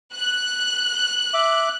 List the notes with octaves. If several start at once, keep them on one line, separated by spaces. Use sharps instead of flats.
F#6
E5 D6